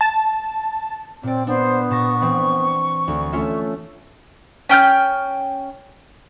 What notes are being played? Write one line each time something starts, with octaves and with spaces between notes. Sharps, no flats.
A5
A#2 C4 D5
B3 D4 C5
A#2 A5 C#6 A#6
E3 C4
D2
A3 C#4 F4 E5
C#4 G5 F6 G6